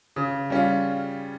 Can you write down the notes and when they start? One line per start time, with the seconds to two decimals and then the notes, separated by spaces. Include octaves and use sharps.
0.16 C#3
0.50 G3 C#4 F4